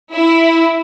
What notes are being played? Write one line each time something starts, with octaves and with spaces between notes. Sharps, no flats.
E4